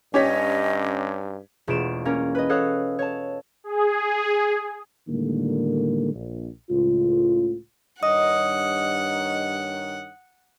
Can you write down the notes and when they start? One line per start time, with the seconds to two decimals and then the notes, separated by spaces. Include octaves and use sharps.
0.14 G2 C#4 G4 C#5 D#5 B6
1.67 E1 A3 F4 D7 E7
2.05 A#3 C#4 A#4
2.35 B4 D#5
2.49 A4 C#5 F5 D#6 F#6
2.99 C#5 A5
3.64 G#4
5.08 A2 D3 D#3 G3 G#3 A#3
6.14 A#1
6.69 C#2 A2 F4
8.03 G2 D#3 C#5 D#5 F#5 D#6